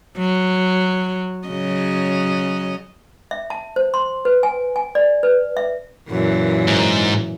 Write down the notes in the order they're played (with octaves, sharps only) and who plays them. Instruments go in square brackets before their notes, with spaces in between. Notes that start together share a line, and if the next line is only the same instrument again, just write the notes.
[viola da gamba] F#3
C#3 F#3 D#5
[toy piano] E5
A5
C5
C6
B4
G#5
G#5
D5
B4
E5
[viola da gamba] F#2 A#2 E3
[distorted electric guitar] G#2